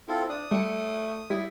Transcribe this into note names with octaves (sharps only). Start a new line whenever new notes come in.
C4 E4 F4 A4
D4 D#6
G3 A3 C#7
G3 E4